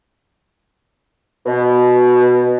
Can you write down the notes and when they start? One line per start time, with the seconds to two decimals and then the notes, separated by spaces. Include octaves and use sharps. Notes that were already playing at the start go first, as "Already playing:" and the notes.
1.46 B2